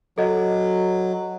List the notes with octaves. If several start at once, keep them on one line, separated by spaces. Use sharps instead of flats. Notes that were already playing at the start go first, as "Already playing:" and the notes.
F#3 A4 D#5